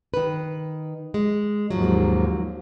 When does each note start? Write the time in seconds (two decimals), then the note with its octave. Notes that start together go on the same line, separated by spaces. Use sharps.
0.14 D#3 B4
1.14 G#3
1.71 D#2 G#2 F3 F#3